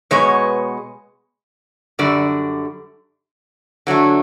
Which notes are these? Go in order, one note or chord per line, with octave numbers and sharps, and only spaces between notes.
B2 G#3 B3 C#5
F#2 D3 G3 D5
D3 F#3 A3